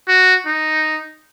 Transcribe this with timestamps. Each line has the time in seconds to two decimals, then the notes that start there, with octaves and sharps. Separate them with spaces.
0.08 F#4
0.46 D#4